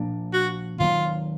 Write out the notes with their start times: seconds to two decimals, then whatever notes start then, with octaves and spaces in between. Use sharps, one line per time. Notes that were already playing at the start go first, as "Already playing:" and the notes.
Already playing: A#2 F3 A#3 D4
0.33 F#4
0.80 D#3 F#3 A#3 F4